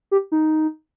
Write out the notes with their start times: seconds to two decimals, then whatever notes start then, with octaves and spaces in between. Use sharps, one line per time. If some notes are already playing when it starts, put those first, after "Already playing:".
0.11 G4
0.32 D#4